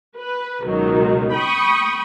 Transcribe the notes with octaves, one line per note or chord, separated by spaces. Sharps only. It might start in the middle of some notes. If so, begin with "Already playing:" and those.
B4
C#2 B2 D#3 F#3
G5 B5 C#6 D#6